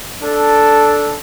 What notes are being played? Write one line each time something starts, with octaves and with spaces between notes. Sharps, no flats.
D4 A4